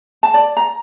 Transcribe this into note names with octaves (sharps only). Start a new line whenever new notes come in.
A5
D5
A#5